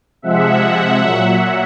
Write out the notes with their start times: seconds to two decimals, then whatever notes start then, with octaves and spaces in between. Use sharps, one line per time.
0.22 C3 F3 G#3 E5 F#5
0.61 E5 F#5
0.99 A#2 F#3